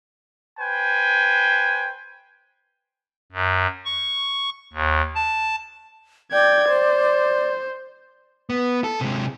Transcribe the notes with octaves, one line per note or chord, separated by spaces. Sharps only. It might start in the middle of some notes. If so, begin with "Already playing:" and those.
B4 C5 G5 G#5
F#2
C#6
D#2
A5
D5 G5 G#6
C5
B3
A4
C3 G#3